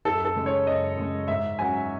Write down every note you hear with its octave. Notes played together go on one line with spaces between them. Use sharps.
F#2 A4
A4
C#3 G#3
C#5
F#2 D#5
C#3 G#3
G#2 E5
F#3 C#4 F#4 G#5